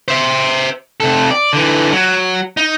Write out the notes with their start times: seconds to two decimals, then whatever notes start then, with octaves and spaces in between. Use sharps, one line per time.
0.08 C5 E5
1.00 C3 A4
1.31 D5
1.53 D3 E3
1.92 F#3
2.57 D#4